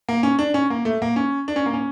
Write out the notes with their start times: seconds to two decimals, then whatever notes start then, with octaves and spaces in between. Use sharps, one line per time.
0.09 A#3
0.23 C#4
0.39 D4
0.54 C#4
0.70 A#3
0.85 A3
1.02 A#3
1.16 C#4
1.48 D4
1.56 C#4
1.66 A#3
1.73 C#4